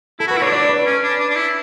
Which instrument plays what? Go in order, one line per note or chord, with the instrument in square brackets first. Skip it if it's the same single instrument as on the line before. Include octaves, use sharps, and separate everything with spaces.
[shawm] E4 [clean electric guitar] A4
[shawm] F#4
[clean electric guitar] B4
[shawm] E4
[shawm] D4 [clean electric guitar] C#5
[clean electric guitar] D5
B4
[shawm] C#4
D4
D4
D4
E4